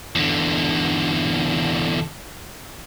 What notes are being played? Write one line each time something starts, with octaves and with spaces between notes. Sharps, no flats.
E2 D3